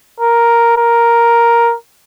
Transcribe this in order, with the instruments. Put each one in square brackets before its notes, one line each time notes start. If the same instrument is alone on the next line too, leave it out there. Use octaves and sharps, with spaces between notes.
[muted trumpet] A#4
A#4